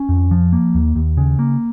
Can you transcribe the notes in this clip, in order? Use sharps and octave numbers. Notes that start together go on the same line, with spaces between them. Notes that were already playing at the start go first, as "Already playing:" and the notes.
Already playing: C#4
F2
F3
A#3
D#2
D#2
C#3
A#3